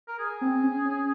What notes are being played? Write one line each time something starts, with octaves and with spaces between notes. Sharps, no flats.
A#4
G#4
C4
C#4
C#4